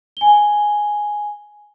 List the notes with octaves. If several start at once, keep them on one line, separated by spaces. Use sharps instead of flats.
G#5 G7